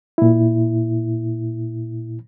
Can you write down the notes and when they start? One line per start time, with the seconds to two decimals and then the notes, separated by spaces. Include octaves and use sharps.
0.18 A#2 E4